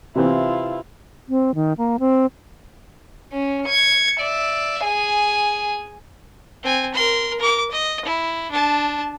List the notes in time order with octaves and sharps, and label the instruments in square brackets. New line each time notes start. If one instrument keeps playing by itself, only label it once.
[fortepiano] C3 E3 C4 [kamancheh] E4 F4
[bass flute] C4
D#3
A#3
C4
[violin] C#4
G#6 C#7
D5 E5
G#4 G#5
[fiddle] C4 G#5
A#4 C6
A#4 D6
D#5
E4
D4 A5